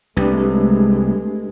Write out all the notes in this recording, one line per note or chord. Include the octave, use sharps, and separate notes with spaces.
C2 G#3 A3 D4 G4 B4